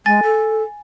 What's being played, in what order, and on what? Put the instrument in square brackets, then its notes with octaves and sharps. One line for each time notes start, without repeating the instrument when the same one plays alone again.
[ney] G#3 [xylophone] G#5 A6
[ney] A4